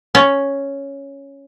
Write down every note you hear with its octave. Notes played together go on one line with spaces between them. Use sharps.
C#4